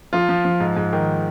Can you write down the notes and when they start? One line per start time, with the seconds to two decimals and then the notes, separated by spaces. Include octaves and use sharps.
0.13 F3 F4
0.29 F3
0.45 F3
0.60 G#2
0.77 G#2
0.93 D#3